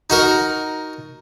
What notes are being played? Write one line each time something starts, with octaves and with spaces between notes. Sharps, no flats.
D#4 F#4 A#4